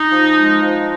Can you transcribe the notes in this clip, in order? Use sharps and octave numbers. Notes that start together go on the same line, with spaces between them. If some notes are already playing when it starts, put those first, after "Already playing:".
Already playing: D#4
F3
G#3
F3